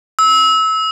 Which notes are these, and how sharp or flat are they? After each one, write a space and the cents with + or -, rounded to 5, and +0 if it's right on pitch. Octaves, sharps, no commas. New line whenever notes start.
E6 -25